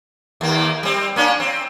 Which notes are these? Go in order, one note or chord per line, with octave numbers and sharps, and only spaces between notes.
D#2 A#3
G3 C4
A#3 C#4 D4
C4